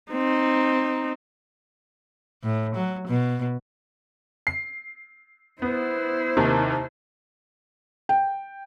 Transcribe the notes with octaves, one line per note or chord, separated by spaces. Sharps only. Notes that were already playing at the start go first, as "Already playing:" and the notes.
C4 D#4
A2
F#3
B2
C7
B3 E4 C5
D#2 C3 D#3
G5